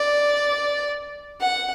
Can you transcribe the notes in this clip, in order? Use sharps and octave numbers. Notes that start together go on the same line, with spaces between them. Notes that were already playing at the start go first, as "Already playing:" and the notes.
Already playing: D5
F#5